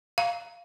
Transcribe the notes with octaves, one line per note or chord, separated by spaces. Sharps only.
F5